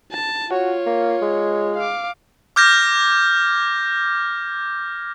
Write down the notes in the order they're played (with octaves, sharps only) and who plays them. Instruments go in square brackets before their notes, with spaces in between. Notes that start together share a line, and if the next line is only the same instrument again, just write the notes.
[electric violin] A5
[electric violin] F4 C#5 [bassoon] F#4
[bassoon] A#3
G#3
[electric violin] F5 D6
[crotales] D6 F6 G6 G#6 A#6